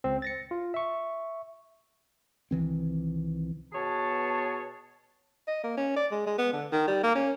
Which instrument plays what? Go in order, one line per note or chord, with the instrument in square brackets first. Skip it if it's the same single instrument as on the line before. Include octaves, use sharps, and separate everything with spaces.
[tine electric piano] C#2 C4
A6 A#6 C#7
F4
E5 C#6
[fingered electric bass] C2 D#3 E3 C4
[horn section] B2 B3 G#4 C#5 A5
[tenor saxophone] D#5
A#3
C#4
D5
G#3
G#3
B3
D3
D#3
G3
A#3
C#4